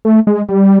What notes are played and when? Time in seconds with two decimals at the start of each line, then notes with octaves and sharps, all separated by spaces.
0.05 A3
0.27 G#3
0.49 G3